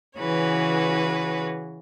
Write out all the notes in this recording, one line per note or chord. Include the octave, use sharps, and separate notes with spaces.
C#3 E3 F#4 G#4 B4 C#5